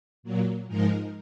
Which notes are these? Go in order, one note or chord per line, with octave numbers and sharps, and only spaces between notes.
A#2 F#3 A#3
G#2 F3 G#3 D#4 A#4